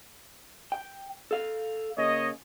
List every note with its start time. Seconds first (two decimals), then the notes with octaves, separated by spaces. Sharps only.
0.72 G5
1.31 A4 F5
1.98 C#3 A#3 C#5 D#5